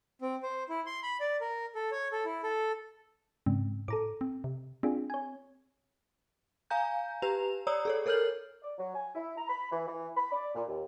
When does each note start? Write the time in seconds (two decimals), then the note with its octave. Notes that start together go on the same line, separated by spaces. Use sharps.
0.22 C4
0.43 C5
0.69 E4
0.87 C6
1.03 B5
1.20 D5
1.41 A#4
1.75 A4
1.92 C#5
2.12 A4
2.25 E4
2.43 A4
3.46 G#2 C#3 C4
3.88 A2 A4 A#5 D6
4.21 C4
4.44 C3
4.83 C4 D4 F4 G#4
5.10 C#5 G#5
6.70 F5 G#5 A#5 G6
7.22 G4 B4 A#5 F7
7.67 C#5 D5 A#5 D#6 E6
7.85 G#4 A4 C#5
8.06 A4 A#4 C#5 F6 G6 F#7
8.63 D5
8.78 F#3
8.96 G#5
9.15 E4
9.38 A#5
9.49 B5
9.72 E3
9.88 E3
10.16 B5
10.32 D5
10.55 A#2
10.67 D#2